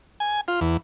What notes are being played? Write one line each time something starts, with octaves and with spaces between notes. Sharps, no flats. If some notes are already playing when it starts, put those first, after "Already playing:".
G#5
F4
E2